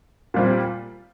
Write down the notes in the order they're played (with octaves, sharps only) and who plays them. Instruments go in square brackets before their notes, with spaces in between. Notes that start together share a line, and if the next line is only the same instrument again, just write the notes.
[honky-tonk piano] A#2 G3 C4 F4